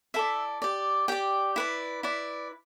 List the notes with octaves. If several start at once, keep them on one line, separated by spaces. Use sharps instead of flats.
E4 A4 D5 E5
G4 D5
G4 D5 G5
E4 B4 D5
E4 B4 D5